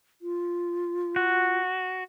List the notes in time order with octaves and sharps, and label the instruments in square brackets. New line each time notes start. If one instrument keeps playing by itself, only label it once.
[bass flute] F4
[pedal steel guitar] F#4